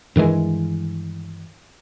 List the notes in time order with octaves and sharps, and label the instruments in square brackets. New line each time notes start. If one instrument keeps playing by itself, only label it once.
[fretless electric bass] G2 D#3 E3 G#3